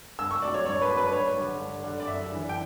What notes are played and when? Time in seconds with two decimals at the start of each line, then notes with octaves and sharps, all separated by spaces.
0.19 G2 E6
0.31 C#6
0.42 F#3 A3 D4 D5
0.54 C#5
0.66 G2 C#5
0.82 B4
0.89 F#3 A3 D4
0.97 B4
1.08 B4
1.13 G2 C#5
1.36 D3 G3 D4
1.60 G2
1.84 D3 G3 D4
2.00 D5
2.07 F#2 E5
2.30 E3 G3 D4
2.49 G5